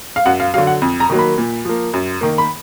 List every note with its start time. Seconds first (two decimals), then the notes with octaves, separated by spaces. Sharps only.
0.16 F5
0.26 F#2 F#5
0.40 F5
0.54 D3 F#3 F5
0.67 F#5
0.82 F2
1.00 A#5
1.10 D#3 F#3 A#3
1.19 B5
1.38 A#2
1.65 F3 A#3
1.93 F#2
2.21 D#3 A#3
2.38 B5